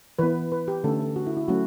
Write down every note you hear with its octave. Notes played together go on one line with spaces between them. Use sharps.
E3 B3 B4
B4
G4
D3 A3 C#4 A4
F#4
E4
E4
F#3 A3 C#4 F#4